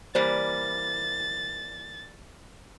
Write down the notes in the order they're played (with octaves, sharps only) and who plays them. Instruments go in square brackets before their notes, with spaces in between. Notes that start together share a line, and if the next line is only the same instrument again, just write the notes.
[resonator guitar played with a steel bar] E3 G3 A#3 [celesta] C5 [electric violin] A6